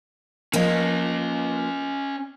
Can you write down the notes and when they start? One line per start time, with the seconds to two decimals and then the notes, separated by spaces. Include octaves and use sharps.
0.53 F3 A#3 C#4 D#5